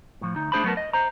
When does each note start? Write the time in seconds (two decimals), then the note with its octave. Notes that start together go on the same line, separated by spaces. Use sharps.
0.21 A2 F3
0.36 D2 D#4
0.52 A3 D4 G#4 C5 A5 B5
0.64 F#3 A3 B3 A#4 A5
0.77 D#5
0.93 C5 A#5